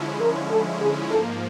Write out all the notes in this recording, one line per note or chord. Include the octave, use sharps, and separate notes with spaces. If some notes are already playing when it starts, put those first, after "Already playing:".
Already playing: D3 F3 G#3 C#4 E4
A#4
A4
G#4
G#2 F3 A#3 A4